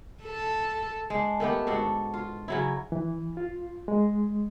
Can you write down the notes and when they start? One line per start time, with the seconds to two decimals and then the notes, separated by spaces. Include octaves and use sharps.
0.23 A4
1.10 G#3 D4
1.40 D#3 A3 B3 G4
1.67 G#2 D4 F#4 A4
2.14 F4
2.48 C#3 F#3 E4
2.92 E3
3.37 F4
3.88 G#3